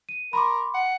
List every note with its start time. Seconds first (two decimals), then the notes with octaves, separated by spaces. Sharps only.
0.09 D#7
0.33 A#4 B5 C6 D6
0.74 F#5